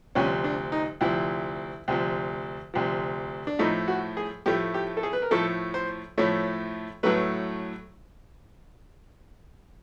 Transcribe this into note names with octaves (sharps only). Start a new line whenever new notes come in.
D2 C3 F3 C#4
D4
D#4
D2 C3 F3 E4
D2 C3 F3
D2 C3 F3
D4
A2 F3 A3 D#4
F#4
G#4
A2 F3 A3 G4
G4
A4
G#4
B4
A#4
A2 F3 A3 A4
C5
A2 F3 A3 C#5
A2 F#3 A3 B4